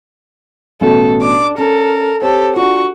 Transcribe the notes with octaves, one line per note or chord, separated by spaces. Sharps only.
A1 B2 F#4 A4
D4 D6
C#4 A4 A#4
C4 G4 A4 C5 C#5
D4 F4 F#4 C#6